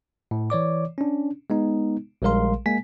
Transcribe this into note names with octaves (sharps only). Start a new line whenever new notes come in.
A2
E3 C#5 D5 D6
C#4 D4
G#3 B3 D#4
A#1 G3 G#3 A#4 F5 C6
G#3 A#3 G#5 B6